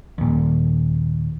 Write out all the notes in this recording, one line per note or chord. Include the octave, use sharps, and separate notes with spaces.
D#2 A#2